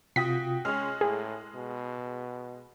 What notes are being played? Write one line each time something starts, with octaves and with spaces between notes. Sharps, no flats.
C3 F4 F#4 G5 D#6 B6
G#3 C#4 F6
A2 G#4
B2